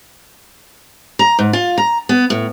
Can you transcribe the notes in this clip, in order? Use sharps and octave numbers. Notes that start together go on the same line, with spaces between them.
A#5
G#2
F4
A#5
B3
A2